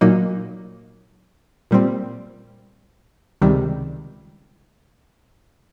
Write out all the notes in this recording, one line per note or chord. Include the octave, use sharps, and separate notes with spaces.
A#2 F#3 A#3 D#4
A#2 G3 C4
C#2 C3 D#3 G3